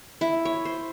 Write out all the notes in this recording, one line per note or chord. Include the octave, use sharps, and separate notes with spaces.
E4
C#5
C5